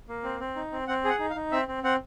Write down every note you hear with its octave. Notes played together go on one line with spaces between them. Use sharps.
A#3
C4
C4
D#4
C4
C4 F#5
G#4
F#5
D#4
F5
D#4
C4 E5
C4
C4 F#5